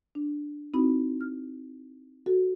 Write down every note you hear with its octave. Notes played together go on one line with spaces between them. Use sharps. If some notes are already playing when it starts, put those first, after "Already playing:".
D4
C4 D#4 E4 F#4 B5
F6
F#4 A4